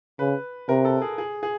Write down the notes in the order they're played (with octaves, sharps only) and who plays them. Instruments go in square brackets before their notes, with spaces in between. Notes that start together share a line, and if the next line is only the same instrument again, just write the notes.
[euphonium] C#3 [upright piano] B4
[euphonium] C3 [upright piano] A#4
[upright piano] A4
G#4
G#4
G#4